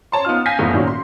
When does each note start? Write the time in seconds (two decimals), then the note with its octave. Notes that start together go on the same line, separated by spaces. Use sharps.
0.12 C#5 A5 C6
0.25 B3 D#4 F4 F6
0.46 F5 G#5 G6 A#6 B6
0.59 F#1 E2 A2 B3 F4
0.73 A#2 D#3 C#4 F#4
0.87 C6